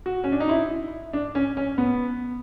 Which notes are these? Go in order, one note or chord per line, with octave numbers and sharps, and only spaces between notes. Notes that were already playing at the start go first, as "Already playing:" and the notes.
F#4
C#4
D4
D#4
E4
D4
C#4
C#4
B3